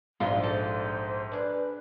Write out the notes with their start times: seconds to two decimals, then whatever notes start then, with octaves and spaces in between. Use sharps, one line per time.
0.20 A#1 G#2 B2 D4 F4 G4 C6
0.43 A4 C5
1.32 D4 G#4 A#4 B4